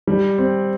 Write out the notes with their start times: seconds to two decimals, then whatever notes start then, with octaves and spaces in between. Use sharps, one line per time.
0.07 G3
0.38 C4